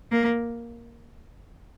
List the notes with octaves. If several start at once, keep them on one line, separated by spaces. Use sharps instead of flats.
A#3